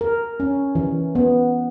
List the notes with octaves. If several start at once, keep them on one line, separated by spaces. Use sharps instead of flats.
A#4
C#4
E3
B3